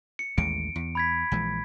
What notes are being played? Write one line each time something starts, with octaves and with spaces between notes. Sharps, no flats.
C#7
A1 D#2 G#3 D7
E2
B5 G#6 B6
A#1 E3 G#3